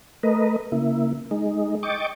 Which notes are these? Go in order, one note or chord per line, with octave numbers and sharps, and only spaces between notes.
A3 A#4 B4 D#5
C#3 A#3 E4
G#3 D#4
D#5 G5 C#6 D6 A6